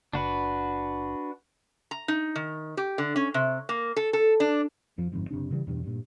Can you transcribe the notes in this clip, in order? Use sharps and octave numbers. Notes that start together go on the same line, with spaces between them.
F#1 D4 F#4 B4
A#5
D#4
D#3
G4
D3
C#4
C3
A#3
A4
A4
D4
F2 F3
G1 F2 G#2
F#1 C3 D4
C#3 E3 G3
E2 G2 B2
G2 A#2